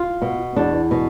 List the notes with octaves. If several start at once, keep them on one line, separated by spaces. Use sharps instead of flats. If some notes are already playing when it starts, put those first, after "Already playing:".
Already playing: F4
B2
E2 D4
B2